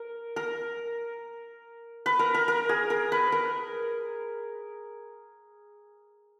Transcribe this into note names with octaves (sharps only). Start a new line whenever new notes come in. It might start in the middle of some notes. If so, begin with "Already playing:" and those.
Already playing: A#4
A#4
B4
A#4
A#4
A#4
G#4
A#4
B4
A#4